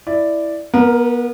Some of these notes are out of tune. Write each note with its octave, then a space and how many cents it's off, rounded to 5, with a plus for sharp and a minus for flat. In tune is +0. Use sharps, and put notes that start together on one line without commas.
E4 +0 D5 +0
B3 -35 A#4 +5